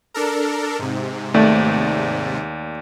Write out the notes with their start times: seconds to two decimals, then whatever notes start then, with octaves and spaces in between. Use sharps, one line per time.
0.14 D4 A4 A#4
0.79 G#2 C3
1.34 D#2 A3 D5